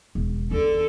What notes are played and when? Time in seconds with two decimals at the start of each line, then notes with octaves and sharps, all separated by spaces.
0.15 E1
0.51 E2 D3 A4